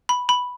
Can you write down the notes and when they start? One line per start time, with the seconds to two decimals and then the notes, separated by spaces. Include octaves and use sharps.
0.09 B5
0.29 B5